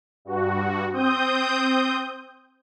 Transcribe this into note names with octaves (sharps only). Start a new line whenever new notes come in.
G2 F#4
C4 D#6 G6